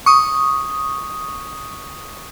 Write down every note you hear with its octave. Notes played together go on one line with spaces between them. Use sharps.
C#6 D#6